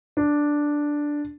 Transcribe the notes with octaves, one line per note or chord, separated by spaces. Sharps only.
D4